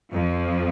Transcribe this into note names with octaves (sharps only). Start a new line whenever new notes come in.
F2 F3